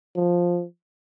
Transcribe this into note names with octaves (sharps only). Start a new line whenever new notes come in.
F3